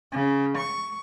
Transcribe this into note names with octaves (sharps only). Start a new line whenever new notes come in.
C#3
C#6